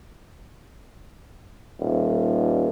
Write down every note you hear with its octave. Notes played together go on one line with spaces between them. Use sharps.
D#1